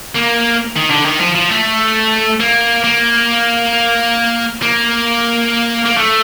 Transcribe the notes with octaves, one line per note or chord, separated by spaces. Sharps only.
A#3
D#3
D3
D#3
F3
F3
A3
A#3
A#3
A#3
A#3
A3